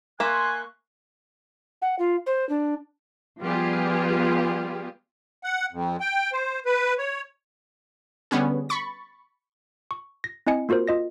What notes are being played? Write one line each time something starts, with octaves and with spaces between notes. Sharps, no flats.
A#3 E5 G#5 C6 C#6 F#6
F#5
F4
C5
D4
F3 G3 B3 F4 G4 G#4
F#5
F2
G5
C5
B4
C#5
D3 G3 B3 C#4 G#4
B5 C#6 A6
C#6
A#6
C4 E4 D#5 G#5 C#7
A#3 F4 F#4 A#4 C5
F4 D#5 A#6